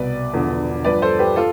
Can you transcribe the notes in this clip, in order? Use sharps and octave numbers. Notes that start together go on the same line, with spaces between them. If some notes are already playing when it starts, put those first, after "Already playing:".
Already playing: C2 B2 B4 D5
E1 E2 D3 F3
G1 G2 F3 B4 D5
A4 C5
G4 B4
F4 A4